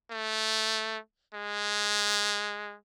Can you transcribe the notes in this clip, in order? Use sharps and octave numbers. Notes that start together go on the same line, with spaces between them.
A3
G#3